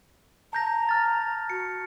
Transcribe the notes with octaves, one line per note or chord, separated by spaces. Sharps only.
A5 A#5 G6 A#6
F6 A6
F#4 C#7